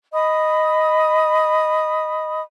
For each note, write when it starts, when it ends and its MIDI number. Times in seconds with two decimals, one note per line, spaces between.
0.13 2.41 75
0.13 2.41 83
0.13 2.41 87